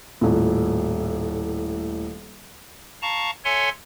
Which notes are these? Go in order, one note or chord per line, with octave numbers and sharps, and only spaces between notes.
D#1 A2
F5 A5 A#5 C#6
A4 C#5 E5 F#5 G#5 C6